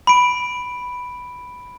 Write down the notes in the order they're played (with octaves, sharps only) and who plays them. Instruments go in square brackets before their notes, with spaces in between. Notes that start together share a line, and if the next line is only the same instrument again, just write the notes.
[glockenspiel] B5 D7